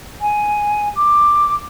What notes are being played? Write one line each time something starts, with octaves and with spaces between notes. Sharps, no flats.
G#5
D6